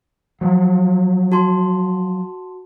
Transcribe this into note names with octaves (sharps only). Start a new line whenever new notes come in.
F3 F#3
F#4 A5 C6